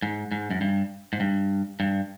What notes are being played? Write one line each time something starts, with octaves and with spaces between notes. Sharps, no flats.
G#2
G#2
F#2
G2
G#2
G2
G2